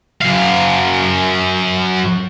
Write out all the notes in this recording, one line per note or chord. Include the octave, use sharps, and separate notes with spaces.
F#2 F5